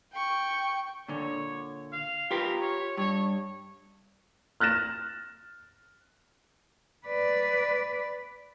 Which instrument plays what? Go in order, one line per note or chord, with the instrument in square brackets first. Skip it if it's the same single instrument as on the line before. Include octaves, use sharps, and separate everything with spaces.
[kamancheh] G5 C#6
[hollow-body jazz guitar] A#2 D3 [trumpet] C#5
[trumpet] F5
[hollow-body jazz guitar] F4 G4 B4 [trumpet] A#4
[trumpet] C#5
[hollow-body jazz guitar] G2 [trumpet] C#5
[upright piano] F6 F#6 A6 A#6 E7
[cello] B4 D5